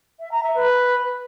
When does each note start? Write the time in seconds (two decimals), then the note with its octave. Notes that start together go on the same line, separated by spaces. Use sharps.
0.20 E5
0.31 A#5
0.43 E5
0.55 B4